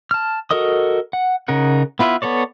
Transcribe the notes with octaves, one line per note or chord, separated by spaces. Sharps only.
A5 F6
F#4 A4 A#4 D#5 D#6
F#5
C#3 D#4 A#4 F#5
B3 E4 F4 B4 E5
B3 A4 C#5 D5